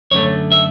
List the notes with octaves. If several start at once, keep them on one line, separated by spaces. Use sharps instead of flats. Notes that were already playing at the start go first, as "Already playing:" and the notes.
F#2 D3 A3 C#5
E5